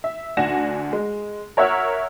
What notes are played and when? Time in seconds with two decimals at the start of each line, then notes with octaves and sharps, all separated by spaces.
0.04 E5
0.37 D2 D4 F#5 G#5 A#6 E7
0.93 G#3
1.57 A#4 C#5 E5 F#5 E6 F6